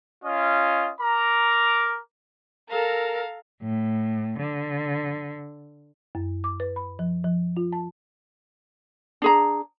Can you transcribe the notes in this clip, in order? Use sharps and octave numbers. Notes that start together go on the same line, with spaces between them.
C#4 F4 D#5
A#4 A#5 D6
A4 A#4 F5 A#5
A2
D3
F#2
D6
B4
B5
F3
F3
F4
A5
D4 G#4 A#5